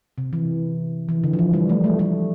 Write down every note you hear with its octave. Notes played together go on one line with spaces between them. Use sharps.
C3
E3
E3
D3
F3
E3
G3
A3
A3
A3